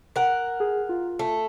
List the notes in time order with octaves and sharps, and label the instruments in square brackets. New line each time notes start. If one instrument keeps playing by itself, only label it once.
[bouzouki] A#4 F#5
[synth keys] G#4
F4
[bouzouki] A3